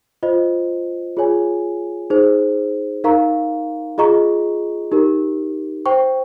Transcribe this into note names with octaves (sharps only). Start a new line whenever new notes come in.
F4 C5 D#5
F4 G#4 C#5 G#5
D#4 G#4 C5
D#4 A#4 F5 A#5 C#6
F4 G#4 D#5 A#5 C#6
D#4 G4 A#4
C5 G5 C#6